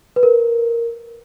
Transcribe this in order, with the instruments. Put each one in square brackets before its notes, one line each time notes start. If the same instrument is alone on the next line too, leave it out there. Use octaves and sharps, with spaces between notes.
[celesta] B4
A#4